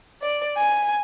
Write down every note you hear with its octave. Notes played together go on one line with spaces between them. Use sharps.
D5
G#5